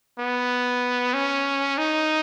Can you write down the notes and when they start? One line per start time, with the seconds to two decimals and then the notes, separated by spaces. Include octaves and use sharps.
0.18 B3
1.14 C#4
1.78 D#4